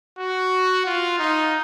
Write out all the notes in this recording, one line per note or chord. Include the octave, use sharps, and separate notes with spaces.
F#4
F4
D#4